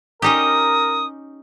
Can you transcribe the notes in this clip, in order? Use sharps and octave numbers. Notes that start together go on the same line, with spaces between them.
C#4 D#4 G4 A#4 D#6